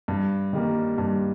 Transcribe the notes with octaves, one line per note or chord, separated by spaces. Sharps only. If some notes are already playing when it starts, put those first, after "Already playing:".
G2
D#3 G3 A#3
G2